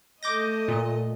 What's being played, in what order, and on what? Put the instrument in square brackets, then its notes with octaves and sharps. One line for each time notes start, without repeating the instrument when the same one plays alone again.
[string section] A3 D#5 [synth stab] D6 G6 A#6
[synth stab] A#2